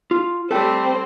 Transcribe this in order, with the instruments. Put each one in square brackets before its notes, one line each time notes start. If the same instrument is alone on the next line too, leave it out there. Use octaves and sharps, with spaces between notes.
[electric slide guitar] F4
[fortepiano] G3 A3 [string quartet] C4 [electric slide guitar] A4 G5